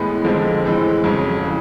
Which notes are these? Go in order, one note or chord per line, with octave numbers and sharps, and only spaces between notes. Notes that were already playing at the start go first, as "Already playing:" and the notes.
Already playing: A2 E3 G#3 B3
F2 D3 F3 G#3 C4
A2 E3 G#3 C4
F2 C#3 F#3
C#3 E3